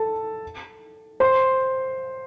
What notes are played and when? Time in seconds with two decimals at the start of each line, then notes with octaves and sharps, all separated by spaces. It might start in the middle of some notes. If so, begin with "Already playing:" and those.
Already playing: A4 A5
1.20 C5 C6